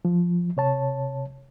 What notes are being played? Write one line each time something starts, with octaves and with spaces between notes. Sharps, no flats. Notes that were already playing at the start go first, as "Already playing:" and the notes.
F3
C3 C#5 A5